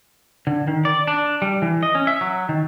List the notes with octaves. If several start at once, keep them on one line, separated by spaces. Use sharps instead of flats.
D3
D#3
D5
D4
G3
E3
D#5
C#4
E5
F#3
D#3